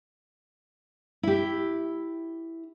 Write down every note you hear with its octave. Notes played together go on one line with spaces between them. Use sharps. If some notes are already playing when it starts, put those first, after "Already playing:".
E4 G4